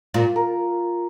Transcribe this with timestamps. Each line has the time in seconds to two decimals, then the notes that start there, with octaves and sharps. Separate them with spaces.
0.14 A#2 F4
0.36 A#4